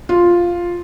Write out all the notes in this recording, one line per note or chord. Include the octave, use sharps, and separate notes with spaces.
F4